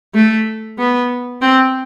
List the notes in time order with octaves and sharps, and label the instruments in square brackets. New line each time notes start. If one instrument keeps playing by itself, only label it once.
[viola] A3
B3
C4